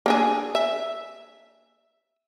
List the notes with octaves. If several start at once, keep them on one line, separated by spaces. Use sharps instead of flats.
A#3 D4 G#4
E5